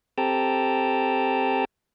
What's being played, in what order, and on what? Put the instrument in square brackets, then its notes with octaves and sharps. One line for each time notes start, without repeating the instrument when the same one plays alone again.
[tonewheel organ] C4 G4 A4 G5 A5 A#5